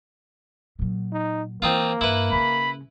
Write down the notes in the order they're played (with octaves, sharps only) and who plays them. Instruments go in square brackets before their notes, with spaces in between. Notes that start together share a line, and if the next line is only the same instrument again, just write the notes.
[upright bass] A#2 F#3
[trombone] D#4
[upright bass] E3 [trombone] A#3 [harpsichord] C4 D#4 F4
[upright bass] G2 [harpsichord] E4 B4
[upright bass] C#3 C#4 [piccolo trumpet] B5